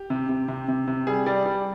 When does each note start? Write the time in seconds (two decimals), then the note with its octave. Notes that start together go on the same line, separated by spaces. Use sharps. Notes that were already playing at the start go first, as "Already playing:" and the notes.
Already playing: G4
0.10 C3
0.29 C3
0.48 C3
0.68 C3
0.87 C3
1.07 G3 G#4
1.26 G3 D5
1.46 G3